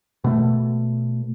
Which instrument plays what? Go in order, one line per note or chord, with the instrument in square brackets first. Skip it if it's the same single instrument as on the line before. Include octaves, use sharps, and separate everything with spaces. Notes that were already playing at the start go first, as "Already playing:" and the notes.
[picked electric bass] B2 A3